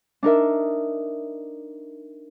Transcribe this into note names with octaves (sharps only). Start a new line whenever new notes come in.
D4 D#4 A#4 E5